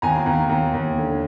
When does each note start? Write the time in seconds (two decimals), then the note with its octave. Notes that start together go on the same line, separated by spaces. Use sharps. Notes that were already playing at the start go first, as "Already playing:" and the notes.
0.02 D#2 G#5 A#5
0.26 D#2
0.49 D#2
0.74 D#2
0.97 D3